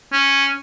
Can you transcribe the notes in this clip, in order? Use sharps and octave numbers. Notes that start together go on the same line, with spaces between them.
C#4